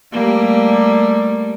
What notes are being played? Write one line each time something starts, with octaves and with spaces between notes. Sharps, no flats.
G3 A3 A#3